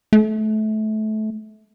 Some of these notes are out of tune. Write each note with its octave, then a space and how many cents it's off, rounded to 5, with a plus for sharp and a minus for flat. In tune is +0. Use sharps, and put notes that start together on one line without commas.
A3 -25